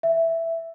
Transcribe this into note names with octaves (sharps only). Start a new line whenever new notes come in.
E5